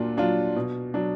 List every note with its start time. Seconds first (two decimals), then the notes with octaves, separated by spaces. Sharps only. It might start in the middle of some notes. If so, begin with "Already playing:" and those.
Already playing: A#2 F#3 D4 F4
0.17 F#3 D4 F4
0.56 B2
0.94 F#3 D4